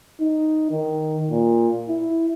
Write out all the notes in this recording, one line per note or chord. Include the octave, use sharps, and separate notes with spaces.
D#4
D#3
A#2
E4